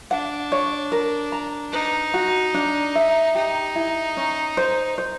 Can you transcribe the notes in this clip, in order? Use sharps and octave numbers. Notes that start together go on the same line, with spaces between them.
D4 F#5
C#5
A#4
A#5
D#4 B4
F#4
D4
E5
D#4 G4
E4
C#4
C5
C5